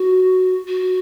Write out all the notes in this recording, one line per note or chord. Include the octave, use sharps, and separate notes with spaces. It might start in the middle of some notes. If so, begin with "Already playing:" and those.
Already playing: F#4
F#4